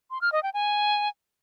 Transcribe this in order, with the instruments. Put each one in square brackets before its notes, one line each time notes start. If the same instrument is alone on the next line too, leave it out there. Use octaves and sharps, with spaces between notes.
[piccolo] C6
F6
D#5
G5
G#5